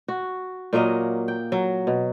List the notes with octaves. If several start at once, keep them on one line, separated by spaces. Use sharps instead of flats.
F#4
A#2 F#3 A#3 D#5
G5
F#3
B2